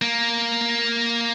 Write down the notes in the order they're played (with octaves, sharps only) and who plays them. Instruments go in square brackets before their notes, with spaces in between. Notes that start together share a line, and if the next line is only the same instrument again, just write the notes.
[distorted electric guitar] A#3